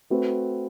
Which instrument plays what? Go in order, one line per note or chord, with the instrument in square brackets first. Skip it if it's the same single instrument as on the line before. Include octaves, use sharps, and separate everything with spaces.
[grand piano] A3 C4 F#4 B4